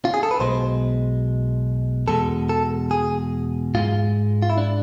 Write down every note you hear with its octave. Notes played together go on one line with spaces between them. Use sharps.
F4
G#4
A4
B4
B1 B2 G#3 C5
E2 B2 G#3 A4
A4
G#4
G#2 G#3 F4
F4
E4
D4